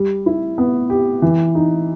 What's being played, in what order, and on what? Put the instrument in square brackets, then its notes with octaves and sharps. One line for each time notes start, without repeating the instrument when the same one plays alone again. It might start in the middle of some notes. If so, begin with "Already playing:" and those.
Already playing: [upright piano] G3
E4
B3
G4
E3
D#4